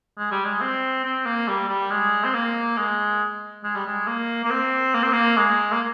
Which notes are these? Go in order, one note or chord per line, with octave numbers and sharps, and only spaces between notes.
G#3
G3
G#3
C4
C4
A#3
G3
G3
G#3
C4
A#3
G#3
G#3
G3
G#3
A#3
A#3
C4
A#3
C4
A#3
G#3
A#3